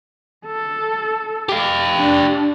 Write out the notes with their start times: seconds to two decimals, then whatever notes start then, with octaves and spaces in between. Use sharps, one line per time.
0.46 A4
1.49 G4 F5
1.98 D4